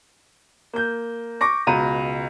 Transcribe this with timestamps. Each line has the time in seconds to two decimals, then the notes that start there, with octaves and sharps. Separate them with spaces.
0.74 A#3 G6
1.41 C#6 D6 A#6
1.67 C#2 B2 A#5 D#7